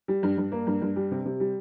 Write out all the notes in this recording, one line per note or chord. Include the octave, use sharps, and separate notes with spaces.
G3
G2
G2
A#3
G2
G2
G3
C3
C3
G3